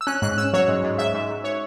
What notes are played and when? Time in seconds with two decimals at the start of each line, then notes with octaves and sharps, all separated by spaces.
0.01 E6
0.07 C#4 F#6
0.22 G#2 F#6
0.37 C#4 E6
0.53 F#3 C#5
0.68 G#2
0.83 G#2
0.98 G#2 E5
1.14 G#2
1.30 G#2
1.44 C#5